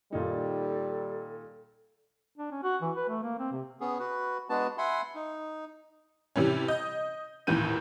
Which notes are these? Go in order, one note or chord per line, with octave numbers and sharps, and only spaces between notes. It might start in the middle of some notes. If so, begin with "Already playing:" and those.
A#2 D#3 G3 D#4 A4
D4
C#4
F#4
E3
B4
A3
A#3
C4
C3
B3 C#4 G#4
F#4 B4
G#3 B3 D4 F#4 B4 A5
E5 F#5 G#5 B5 C6
D#4
C3 E3 G3 C#4
D#5 G6
A1 D#2 A#2 E3 G6 D#7